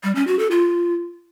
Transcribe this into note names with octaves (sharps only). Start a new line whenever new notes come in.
G3
C#4
F#4
A4
F4